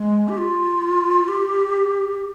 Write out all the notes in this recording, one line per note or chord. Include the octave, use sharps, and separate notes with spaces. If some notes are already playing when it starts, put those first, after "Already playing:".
Already playing: G#3
G4
F4
G4